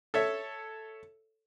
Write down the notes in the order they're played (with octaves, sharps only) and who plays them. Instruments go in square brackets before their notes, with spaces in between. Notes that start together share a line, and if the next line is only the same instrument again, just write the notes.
[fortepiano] A4 C#5 E5